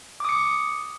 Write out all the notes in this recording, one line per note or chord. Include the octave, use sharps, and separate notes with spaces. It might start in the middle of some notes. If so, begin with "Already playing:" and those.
D6 D#6 C#7